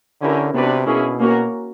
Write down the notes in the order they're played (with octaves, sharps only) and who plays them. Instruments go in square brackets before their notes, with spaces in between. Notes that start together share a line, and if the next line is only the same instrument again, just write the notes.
[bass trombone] D3 [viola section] C#4 E4 G4 A#4
[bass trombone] C3 [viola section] B3 D4 F#4 B4 D5
[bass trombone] B2 [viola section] A#3 C#4 E4 G#4
[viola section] A#3 C#4 F#4 A#4